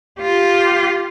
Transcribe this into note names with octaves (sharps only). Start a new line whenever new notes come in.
F4 G4